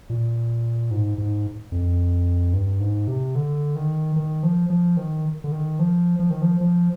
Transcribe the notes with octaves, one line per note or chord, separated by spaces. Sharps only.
A#2
G#2
G#2
F2
G2
G#2
C3
D3
D#3
D#3
F3
F3
D#3
D3
D#3
F3
F3
D#3
F3
F3